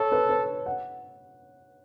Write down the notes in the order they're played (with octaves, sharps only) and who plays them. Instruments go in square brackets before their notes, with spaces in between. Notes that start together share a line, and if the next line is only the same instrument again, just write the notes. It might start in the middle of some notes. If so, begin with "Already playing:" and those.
Already playing: [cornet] A4 [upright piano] C#5
[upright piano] B4
B4
F#5